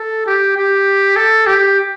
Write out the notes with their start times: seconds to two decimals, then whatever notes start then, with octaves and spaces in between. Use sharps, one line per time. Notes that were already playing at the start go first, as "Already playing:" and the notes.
Already playing: A4
0.26 G4
0.57 G4
1.16 A4
1.46 G4